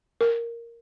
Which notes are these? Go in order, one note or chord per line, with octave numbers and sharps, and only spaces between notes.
A#4